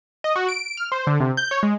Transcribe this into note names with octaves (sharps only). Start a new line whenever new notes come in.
D#5
F#4
D7
D7
F6
C5
D3
C3
G6
C#5
G#3